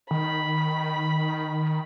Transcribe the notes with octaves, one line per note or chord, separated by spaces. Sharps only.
D#3 B5